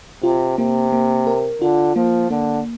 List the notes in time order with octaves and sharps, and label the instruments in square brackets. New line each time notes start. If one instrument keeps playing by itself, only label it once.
[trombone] C3 [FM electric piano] F4
[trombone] C3 [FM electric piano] A#3
[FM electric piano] A#3
A#4
[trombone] D3 [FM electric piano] F4
[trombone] F3 [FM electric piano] A#3
[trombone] D3 [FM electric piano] A#3